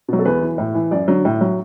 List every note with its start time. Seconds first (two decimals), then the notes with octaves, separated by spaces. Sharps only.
0.08 B2 F#3
0.19 A4
0.25 E2 B4
0.41 E3
0.58 A2
0.75 E3
0.91 F#2 D5
1.08 D3 F#3
1.25 A2
1.41 F#3